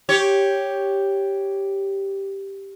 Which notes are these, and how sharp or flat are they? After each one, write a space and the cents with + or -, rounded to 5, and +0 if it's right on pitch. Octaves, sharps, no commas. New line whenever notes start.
G4 +0 C#5 +0